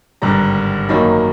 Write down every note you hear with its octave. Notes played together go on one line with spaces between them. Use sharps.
G#1 G2 D3 G3 A#5
F#2 D#3 F#3 A#3 D#4 B5